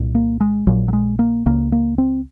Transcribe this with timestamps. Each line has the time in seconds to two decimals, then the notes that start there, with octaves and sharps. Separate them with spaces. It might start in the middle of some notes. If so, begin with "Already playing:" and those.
Already playing: C2 A#2
0.15 A#3
0.41 G#3
0.67 A#1 A#2 F#3
0.88 F#3
0.93 G#3
1.19 A#3
1.46 C#2 C#3 A#3
1.72 A#3
1.98 C4